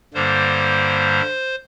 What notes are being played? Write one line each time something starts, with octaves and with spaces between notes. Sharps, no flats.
G2 D3 G3 A#3 C5